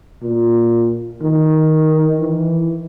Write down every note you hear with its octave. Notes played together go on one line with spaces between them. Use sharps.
A#2
D#3
E3